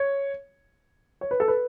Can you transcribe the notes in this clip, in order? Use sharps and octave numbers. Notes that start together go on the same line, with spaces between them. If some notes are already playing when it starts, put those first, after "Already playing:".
Already playing: C#5
C#5
B4
A4
B4